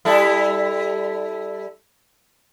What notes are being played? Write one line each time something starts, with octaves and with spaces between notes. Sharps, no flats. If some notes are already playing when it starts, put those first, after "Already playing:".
G3 E4 A4